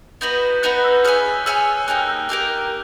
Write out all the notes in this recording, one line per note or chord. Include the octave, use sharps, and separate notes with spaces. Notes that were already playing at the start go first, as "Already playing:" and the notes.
B3 D#4 F#4 B4 G6
B3 D#4 F#4 B4 F#6
E6
G#4 C#5 E5 G#5 F6
G#4 C#5 E5 G#5 E6
A#3 D#4 G4 A#4 F#6
F6
E6
F6
A#3 D#4 G4 A#4